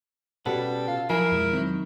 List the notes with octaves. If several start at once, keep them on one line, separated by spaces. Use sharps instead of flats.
B2 G3 C#4 F#4 A4 B4 F#5
F4
F3 F#3 E4 A#4 G#5 C7
F2 B2 G#3
D#3 F#3 C4